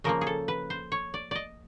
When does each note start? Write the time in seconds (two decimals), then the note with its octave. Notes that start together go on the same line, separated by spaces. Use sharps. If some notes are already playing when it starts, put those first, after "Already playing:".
0.04 C#3 F3 A#3 A#4
0.21 G#4
0.27 A4
0.48 B4
0.70 C5
0.92 C#5
1.14 D5
1.31 D5 D#5